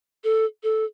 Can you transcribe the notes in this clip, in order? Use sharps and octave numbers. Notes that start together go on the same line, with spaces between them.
A4
A4